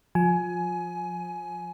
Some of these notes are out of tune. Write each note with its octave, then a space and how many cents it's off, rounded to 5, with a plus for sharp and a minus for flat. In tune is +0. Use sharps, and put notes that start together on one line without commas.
F3 +25 G#5 +20